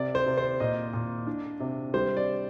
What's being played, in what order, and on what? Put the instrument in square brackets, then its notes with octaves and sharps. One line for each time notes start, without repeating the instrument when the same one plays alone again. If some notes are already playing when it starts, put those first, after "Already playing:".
Already playing: [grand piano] C3 D5
C5
C3
C5
A#2 D#5
A#2
D4
C3
G3 C5
D5